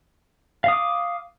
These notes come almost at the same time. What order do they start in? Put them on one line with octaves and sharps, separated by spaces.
F5 D#6 D6